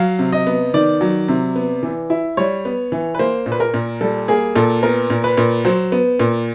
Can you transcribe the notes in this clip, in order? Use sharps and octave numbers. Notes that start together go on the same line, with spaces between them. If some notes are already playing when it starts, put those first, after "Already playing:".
Already playing: F#3 F5
C3
D#5
B3
D#3 D5
F#3
C3
B3
E3
E4
G3 C#5
B3
E3
B4
A#3 C5
A#2
B4
A#4
A#2
G3 A4
A#3 G#4
A#2 A4
B3 A#4
A#2
B4
A#2
F#3 C5
B3
A#2